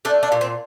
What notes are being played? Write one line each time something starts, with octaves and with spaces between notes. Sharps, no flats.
A3 D4
D4
A#2
C4